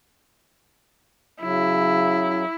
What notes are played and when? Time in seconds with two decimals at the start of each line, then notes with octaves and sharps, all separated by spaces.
1.42 C#3 F#3 E4